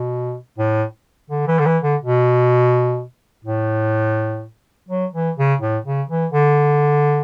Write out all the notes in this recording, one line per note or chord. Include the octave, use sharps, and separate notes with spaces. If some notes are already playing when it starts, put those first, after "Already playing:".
Already playing: B2
A2
D3
E3
D3
E3
D3
B2
A2
F#3
E3
C#3
A2
C#3
E3
D3